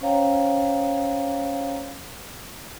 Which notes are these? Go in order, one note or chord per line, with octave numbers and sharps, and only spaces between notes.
C#4 C5 C#5 F5 G5 A#5